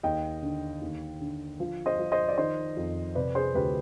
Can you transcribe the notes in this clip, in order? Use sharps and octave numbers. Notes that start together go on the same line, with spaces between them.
D#2 D#5 G5
D3
D#2
D3
F3
C5 D#5
F3
C5 D#5
D5
D#3 C5 D#5
F2
C3 B4 D5
G#4 C5
D2 G4 B4